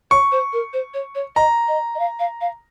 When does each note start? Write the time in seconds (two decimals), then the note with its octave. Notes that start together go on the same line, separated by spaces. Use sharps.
0.11 C#5 C#6
0.32 C5
0.53 A#4
0.73 C5
0.94 C#5
1.15 C#5
1.36 D#5 A#5
1.68 D#5
1.95 D#5
1.99 F5
2.19 F5
2.41 F5